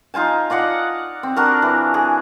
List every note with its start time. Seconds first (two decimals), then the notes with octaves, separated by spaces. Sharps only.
0.14 D#4 F4 G#5 A5
0.50 F4 D5 D#5 F#5
1.23 C4
1.36 D4 F#4 A#4
1.62 E3
1.94 G#4